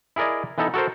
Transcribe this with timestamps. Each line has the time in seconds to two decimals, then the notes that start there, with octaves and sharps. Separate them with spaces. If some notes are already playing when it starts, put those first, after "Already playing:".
0.16 E4 G#4 A#4 D5 D#5
0.58 E3 B3 D#4 A4
0.74 F#4 A4 A#4 C5